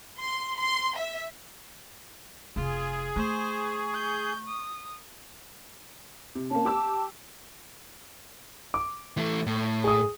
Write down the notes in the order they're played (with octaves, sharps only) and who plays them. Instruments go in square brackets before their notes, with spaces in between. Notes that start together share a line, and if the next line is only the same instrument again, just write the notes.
[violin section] C6
C6
E5
[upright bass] F1 C3 [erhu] F4 [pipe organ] G#4
[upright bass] A3 [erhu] C5 [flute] C#6
[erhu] G6
D#6
[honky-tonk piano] C3
[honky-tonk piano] A#3 C4 C#4 [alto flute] A5
[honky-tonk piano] G4 D6 E6
[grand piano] D6
[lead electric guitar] E3 A3
A2
[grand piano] G#4 D#6